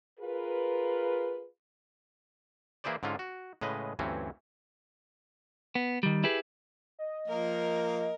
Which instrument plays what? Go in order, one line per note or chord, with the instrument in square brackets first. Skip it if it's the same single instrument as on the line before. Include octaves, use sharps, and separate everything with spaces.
[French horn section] F4 G#4 A#4 B4
[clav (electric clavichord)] E3 A#3 E4 G#4 C5 D5
G#2 D3 C#4 F4
F#4
A2 C#3 G#3 B4 D#5
D2 G2 E3 C4 C#4
[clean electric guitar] B3
D#3 G3
E4 G4 G#4 B4
[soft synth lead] D#5
[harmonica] F3 A#3 [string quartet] A#4